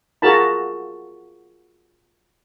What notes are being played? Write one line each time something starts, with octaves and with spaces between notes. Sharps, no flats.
F4 F#4 G#4 A#4 A5 B5